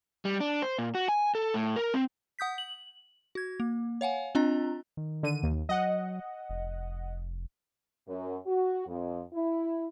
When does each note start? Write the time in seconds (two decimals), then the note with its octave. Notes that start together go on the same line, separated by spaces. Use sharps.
0.25 G3
0.40 D4
0.62 C5
0.79 A#2
0.95 F#4
1.08 G#5
1.35 A4
1.54 A2
1.76 A#4
1.94 C4
2.39 F#5 D#6 G6 B6
2.58 F#7
3.35 F#4 G#6
3.60 A#3
4.01 C#5 F5 F#5 G#5
4.35 C4 D4 F4 D#5 A#5
4.97 D#3
5.23 D3 D#7
5.43 D#2
5.69 F#3 D#5 F#5
6.49 F1
8.07 F#2
8.47 F#4
8.87 F2
9.33 E4